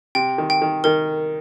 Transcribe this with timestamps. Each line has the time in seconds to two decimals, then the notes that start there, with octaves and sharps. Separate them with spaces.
0.15 C3 G5
0.38 D#3
0.50 G5
0.62 D#3
0.84 D#3 A#4